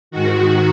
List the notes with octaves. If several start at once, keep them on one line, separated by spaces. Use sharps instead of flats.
G#2 D#3 F#4